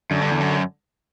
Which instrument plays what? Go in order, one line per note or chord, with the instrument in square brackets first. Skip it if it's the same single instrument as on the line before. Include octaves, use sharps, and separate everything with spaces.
[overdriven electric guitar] F#2 [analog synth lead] D3
[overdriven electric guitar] G2
E2
F#2